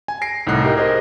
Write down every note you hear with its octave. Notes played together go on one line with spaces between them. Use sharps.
G#5
A#6 C7 D7
C2 A2 D#4 F#6 C7
D#4 G4 A#4 D#5
G#4 A#4 C5 D#5